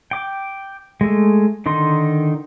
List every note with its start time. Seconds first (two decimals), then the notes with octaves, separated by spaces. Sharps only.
0.11 G5 D6
1.01 G#3 A3
1.66 D3 D#3 D#4 C6